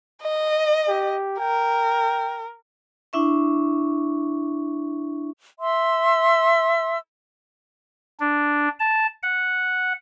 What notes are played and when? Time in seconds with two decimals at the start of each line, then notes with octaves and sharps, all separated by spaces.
0.23 D#5
0.88 G4
1.40 A#4 G5
3.13 D4 E4 E5 C#6
5.60 E5 C6 E6
8.20 D4
8.80 A5
9.23 F#5